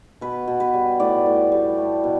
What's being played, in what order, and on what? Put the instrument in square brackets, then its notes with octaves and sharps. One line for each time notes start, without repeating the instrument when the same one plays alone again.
[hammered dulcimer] B2 B4
B2
B4
G3
A2 D5
A2
G3
A3
B2